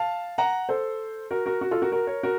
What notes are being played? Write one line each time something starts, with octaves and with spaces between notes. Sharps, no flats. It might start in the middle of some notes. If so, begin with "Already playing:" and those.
Already playing: F5 A5
F#5 A#5
A4 C5
F#4 A#4
F#4 A#4
F#4
F4 A4
F#4 A#4
F#4 A#4
A#4 C#5
F#4 A#4